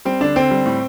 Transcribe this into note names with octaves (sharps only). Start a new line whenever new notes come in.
G3 C4
D3 D4
D3 C4
G3
A2